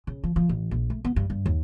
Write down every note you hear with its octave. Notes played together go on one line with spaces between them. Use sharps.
C#3
F3
F3
A1
A#1
A3
B3
G2
G2
D#2